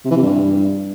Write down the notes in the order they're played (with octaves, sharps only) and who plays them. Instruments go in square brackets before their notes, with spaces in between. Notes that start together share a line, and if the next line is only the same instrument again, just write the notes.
[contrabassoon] C3
E3
C3
G2